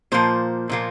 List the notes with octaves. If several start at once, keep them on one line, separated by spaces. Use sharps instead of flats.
A#2 F3 A#3 C5
A#2 F3 A#3